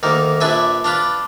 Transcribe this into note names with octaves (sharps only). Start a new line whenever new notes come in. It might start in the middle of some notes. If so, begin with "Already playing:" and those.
D2 D#3 A#3
A#1 D4 B4 E5 G#5
D4 F4 B4